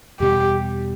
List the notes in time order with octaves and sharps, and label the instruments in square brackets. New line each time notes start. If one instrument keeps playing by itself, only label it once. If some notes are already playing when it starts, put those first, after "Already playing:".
[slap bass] E2 B2 G3 [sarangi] G4